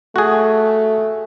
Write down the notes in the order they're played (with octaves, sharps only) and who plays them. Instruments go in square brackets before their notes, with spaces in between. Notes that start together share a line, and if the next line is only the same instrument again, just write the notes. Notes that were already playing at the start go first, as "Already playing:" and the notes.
[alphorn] A3 [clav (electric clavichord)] F#4 G#4